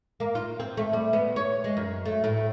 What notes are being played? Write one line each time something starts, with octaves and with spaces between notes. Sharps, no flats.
A#3
F4
C4
A3
G3
B3
C#5
G#3
F#2
A3
A2